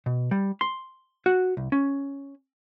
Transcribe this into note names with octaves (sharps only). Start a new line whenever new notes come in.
B2
G3
C6
F#4
C2
C#4